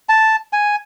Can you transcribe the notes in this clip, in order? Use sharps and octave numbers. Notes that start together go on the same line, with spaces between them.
A5
G#5